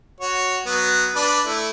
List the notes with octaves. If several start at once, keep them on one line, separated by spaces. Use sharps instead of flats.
F#4 C#5
F#3 B3
D4 B4 D5
A3 E4